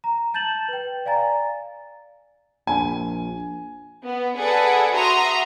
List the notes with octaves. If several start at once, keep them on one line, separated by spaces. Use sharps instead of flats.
A#5
A5 G6 A6 E7 F#7
B4 G5
D5 F5 G#5 A#5 A6
A#1 G#5
B3
G#4 A4 B4 D5 F#5
F#4 E5 A#5 C6 D#6